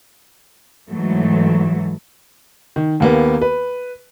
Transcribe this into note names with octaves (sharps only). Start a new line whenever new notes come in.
G#2 E3 F#3 A3
D#3
D#2 A#3 B3
B4